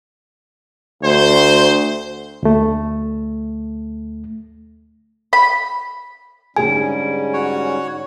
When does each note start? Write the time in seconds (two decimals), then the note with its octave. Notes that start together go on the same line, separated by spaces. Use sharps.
1.03 D2 C5
2.43 D2 A3
5.33 B5
6.56 G#2 D3 G3 C#4 G#4 G#5
7.34 F#4 C#5